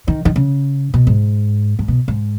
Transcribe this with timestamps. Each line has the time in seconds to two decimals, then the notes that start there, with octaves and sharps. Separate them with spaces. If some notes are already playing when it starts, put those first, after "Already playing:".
0.08 D#3
0.25 D#3
0.36 C#3
0.94 B2
1.07 G#2
1.79 G#2
1.88 B2
2.08 G#2